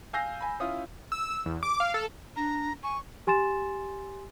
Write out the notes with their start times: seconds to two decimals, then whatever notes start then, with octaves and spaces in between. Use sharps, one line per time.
0.13 F5 G#5 E6 G6 A#6 C7
0.41 G#5 B5
0.60 C#4 E4 F4 D#6
1.12 E6
1.46 E2
1.63 D6
1.80 F5
1.94 A4
2.36 D4 A#5
2.83 G#5 C#6
3.27 G4 G#5 C6 A6 E7